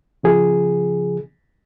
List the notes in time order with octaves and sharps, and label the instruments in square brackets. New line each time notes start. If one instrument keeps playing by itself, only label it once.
[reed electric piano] C#3 F3 G#4